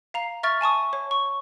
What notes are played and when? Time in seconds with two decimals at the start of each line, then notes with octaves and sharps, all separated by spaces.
0.14 F5 A#5 C7
0.43 E5 C#6 F6 A6
0.61 G#5 A5 C#6 D#6
0.93 C#5
1.11 C#6